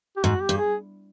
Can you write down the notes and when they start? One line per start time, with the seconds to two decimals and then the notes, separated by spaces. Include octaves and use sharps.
0.17 G4
0.24 G#2 F#4
0.41 G4
0.49 G2
0.58 G#4